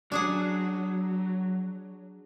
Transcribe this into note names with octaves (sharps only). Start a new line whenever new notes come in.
F#3 D4 G#4 F#5